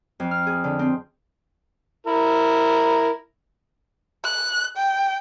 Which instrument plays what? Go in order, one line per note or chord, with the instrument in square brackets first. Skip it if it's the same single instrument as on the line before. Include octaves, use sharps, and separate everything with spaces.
[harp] F2
F6
G#4
D3
C4
[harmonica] E4 A#4
[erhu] F#6
G5